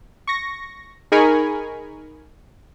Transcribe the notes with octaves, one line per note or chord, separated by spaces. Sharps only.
C#6 A#6
D#4 G#4 A#4 G#5 B5 C#6